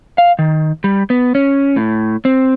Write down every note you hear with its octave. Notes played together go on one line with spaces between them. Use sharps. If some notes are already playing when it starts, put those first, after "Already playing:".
F5
D#3
G3
B3
C#4
A2
C4